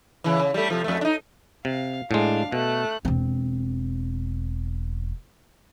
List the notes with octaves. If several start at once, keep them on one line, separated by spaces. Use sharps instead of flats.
C#3 E3
C#3
G3 A3
C3 F3
F2 A3
D4 D#4
C3 F5
A2 G#3 D4 F5
B2 A3 F#6
E1 C4